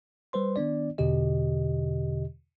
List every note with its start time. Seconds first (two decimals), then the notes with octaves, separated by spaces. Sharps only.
0.33 G3 B4 C5 C6
0.56 D#3 B3 D4 D5
0.98 E2 B2 D3 G4 D#5